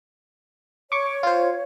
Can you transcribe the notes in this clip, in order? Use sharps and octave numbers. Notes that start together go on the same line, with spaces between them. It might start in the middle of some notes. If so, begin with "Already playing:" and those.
C#5 C#6 D6
F4 C5